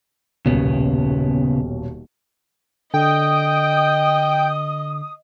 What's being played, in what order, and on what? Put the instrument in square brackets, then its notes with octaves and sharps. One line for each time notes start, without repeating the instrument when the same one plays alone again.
[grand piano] D#1 B1 [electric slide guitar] C#3 B3
[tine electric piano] D3 [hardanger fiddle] D#5 [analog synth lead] G5 [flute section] D#6